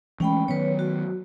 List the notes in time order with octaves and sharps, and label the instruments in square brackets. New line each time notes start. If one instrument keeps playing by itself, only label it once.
[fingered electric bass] E3 G#3 A3 [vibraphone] C#4 G5 B5
[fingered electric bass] D#3 F#3 B3 [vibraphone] B4 C#5
[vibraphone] F#4